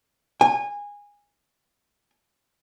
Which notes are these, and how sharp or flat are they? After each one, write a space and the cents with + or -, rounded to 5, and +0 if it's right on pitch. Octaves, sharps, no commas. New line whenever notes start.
G#5 -20